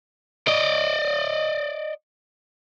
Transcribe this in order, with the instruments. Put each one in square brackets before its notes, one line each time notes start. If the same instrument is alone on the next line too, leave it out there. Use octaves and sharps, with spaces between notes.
[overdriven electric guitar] D5 D#5